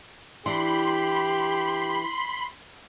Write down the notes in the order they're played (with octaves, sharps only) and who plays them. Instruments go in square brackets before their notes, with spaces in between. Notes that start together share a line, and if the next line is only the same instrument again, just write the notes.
[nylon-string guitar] E3 D4 [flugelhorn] G4 [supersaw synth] B5 C6